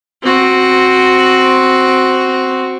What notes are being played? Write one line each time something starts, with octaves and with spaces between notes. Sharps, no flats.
C4 F#4